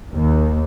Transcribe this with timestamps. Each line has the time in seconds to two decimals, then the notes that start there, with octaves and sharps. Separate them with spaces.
0.13 D#2